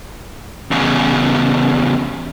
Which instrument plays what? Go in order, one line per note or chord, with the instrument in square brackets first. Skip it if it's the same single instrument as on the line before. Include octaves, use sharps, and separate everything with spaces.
[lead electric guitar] E2 C#3